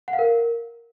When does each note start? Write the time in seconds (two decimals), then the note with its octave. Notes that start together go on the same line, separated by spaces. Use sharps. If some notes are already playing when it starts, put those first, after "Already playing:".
0.08 F#5
0.13 F5
0.19 A#4